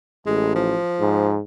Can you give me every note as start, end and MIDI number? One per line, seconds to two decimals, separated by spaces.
0.26 0.76 33
0.26 0.51 56
0.55 1.33 53
1.00 1.40 44